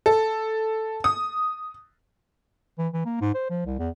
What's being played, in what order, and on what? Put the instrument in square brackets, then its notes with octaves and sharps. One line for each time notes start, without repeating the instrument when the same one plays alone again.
[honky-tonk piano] A4
D#6
[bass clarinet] E3
E3
A#3
G#2
C5
F3
C2
E2